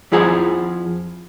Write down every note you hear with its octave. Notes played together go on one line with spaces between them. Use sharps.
F2 F3 E4 G#4 F#5 A#5